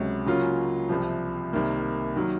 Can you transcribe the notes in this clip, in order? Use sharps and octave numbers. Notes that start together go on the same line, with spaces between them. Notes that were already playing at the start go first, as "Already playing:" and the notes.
Already playing: C#2 C3 F#3 C#4
C#3 F#3 A#3 C#4 F4
C2 C3 F3
C2 C3 D#3 A#3
D#3 F#3 A#3